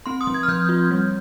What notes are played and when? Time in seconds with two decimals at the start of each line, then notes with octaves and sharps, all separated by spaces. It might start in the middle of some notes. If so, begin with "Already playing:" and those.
0.06 C4 C6
0.21 D#6
0.27 F3
0.34 G#6
0.43 F6
0.48 F3 G6
0.69 F4
0.91 G3